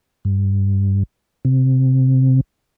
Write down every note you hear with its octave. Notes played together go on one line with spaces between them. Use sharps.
G2
C3